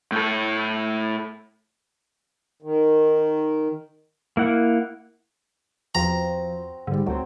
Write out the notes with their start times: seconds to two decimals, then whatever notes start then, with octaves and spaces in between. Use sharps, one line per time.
0.12 A2 A4
2.62 D#3
4.37 A#3 E4 F#5
5.95 E2 F3 C4 F#4 F#5 A#5
6.87 G#2 D3 G3
7.06 C#2 F#3 A3 C4